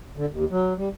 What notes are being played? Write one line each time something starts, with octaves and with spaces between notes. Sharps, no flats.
D3
D#2
F#3
G3